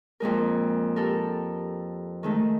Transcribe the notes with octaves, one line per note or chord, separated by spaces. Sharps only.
F2 A#2 G#3 A#4
G4 A4 A#4
D#3 G#3 A3